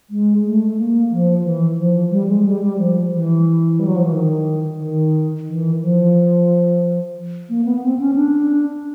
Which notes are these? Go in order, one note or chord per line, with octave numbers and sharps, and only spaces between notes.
G#3
A3
A#3
F3
E3
F3
G3
G#3
G3
G3
F3
E3
G3
F#3
F3
E3
D#3
D#3
E3
F3
A#3
B3
C4
C#4
D4